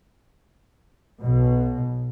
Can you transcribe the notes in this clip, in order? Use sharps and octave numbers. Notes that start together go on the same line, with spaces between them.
B1 B2